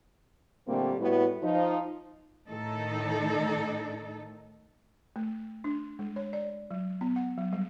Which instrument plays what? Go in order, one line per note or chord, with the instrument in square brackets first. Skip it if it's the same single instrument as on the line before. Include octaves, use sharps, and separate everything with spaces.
[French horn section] A#2 D3 G3 A3 A#3 C4
A2 G3 B3 E4 F#4 B4
F3 D#4
[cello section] A2 D#3 D#4 A4
[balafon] A3
D4
G#3
C#5
D5
F#3
B3
F#5
F#3
G3